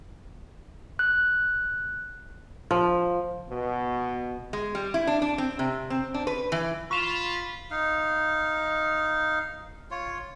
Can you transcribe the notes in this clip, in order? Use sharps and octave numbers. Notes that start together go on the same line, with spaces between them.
F#6
F3
B2
G#3
G3
E4
D4
D4
C4
C3
C4
D4
B4
E3
F4 B5 C#6 E7 F7
D#4 F5
F4 C#5